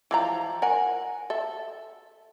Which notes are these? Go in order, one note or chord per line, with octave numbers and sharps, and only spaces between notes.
E3 F3 A#5
A#4 F#5 G#5
A4 E5